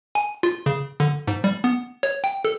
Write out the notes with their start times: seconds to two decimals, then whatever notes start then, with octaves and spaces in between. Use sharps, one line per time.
0.15 G#5
0.43 F4
0.66 C#3
1.00 D3
1.28 G#2
1.44 G3
1.64 B3
2.03 C#5
2.24 G5
2.45 A4